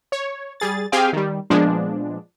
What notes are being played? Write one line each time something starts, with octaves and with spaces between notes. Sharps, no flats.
C#5
G3 G#4 A6
C4 G4 G#4 F5 G5 G#5
D#3 G3
A#2 F3 G#3 B3 D4